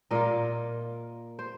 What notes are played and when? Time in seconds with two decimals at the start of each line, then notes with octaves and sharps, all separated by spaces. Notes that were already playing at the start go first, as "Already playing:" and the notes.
0.11 A#2 A#3 F4 A#4 D#5
1.39 C5